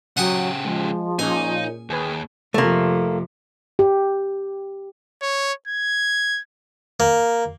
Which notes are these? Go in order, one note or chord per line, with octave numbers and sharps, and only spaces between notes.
C#3 F#3 G4 F#5 G#5 D#6
F3 G#3
A#2 C#4 D#4 G#4 G#5
D#2 G#4 B4
F2 C3 A3 A#3
G4
C#5
G#6
A#3